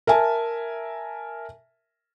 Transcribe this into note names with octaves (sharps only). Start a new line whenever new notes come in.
A#4 E5 G#5 A5